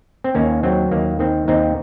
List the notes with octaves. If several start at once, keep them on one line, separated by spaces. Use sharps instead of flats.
C4
D#2 A#3 C#4
F#3 C4
D#2 A#3
D#3 C4
D#2 C4 D#4